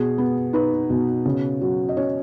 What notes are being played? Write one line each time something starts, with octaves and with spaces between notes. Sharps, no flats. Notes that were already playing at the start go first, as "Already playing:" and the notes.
Already playing: B2 G#4
B3
D#4 B4
B2
C#3
F#3
D#5
C#4 C#5